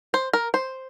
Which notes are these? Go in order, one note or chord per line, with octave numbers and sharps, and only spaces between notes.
C5
A#4
C5